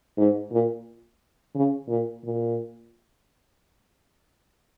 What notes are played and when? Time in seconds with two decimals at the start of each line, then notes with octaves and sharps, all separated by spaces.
0.17 G#2
0.52 A#2
1.55 C#3
1.89 A#2
2.24 A#2